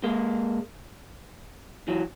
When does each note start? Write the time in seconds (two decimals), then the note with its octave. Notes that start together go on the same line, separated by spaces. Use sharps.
0.04 G#3 A#3
1.88 E3 F#3